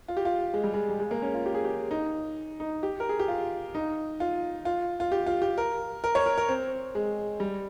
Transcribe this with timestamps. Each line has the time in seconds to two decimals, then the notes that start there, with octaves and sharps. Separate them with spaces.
0.08 F4
0.17 G4
0.25 F4
0.54 G#3
0.64 G3
0.73 G#3
0.89 G3
0.99 G#3
1.11 A#3
1.22 C#4
1.34 F4
1.46 G4
1.54 G#4
1.65 G4
1.91 D#4
2.60 D#4
2.83 G4
3.00 A#4
3.09 G#4
3.19 G4
3.28 F4
3.75 D#4
4.20 F4
4.65 F4
5.00 F4
5.12 G4
5.27 F4
5.42 G4
5.58 A#4
6.04 A#4
6.15 C#5
6.26 A#4
6.38 A#4
6.49 C4
6.95 G#3
7.40 G3